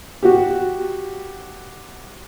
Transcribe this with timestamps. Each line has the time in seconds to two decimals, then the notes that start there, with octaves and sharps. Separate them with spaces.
0.23 F#4 G4